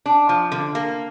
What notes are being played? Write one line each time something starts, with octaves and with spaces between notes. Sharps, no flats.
D4
F3
D3
A#3